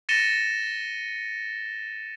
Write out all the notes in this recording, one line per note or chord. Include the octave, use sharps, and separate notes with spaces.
A6 A#6 C#7 D#7 E7 G7